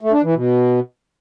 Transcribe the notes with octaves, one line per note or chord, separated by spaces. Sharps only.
A3
D4
E3
B2